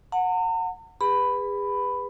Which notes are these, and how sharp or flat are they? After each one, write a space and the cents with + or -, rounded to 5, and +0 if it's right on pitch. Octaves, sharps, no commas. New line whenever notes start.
F#5 -15 A#5 -45
G#4 -40 B4 +0 B5 +10